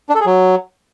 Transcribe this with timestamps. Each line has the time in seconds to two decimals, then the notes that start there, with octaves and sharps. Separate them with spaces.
0.10 D4
0.15 A4
0.20 G#4
0.26 F#3